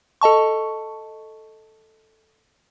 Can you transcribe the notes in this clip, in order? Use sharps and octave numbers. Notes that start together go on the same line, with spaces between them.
A4 D#5 A5 C#6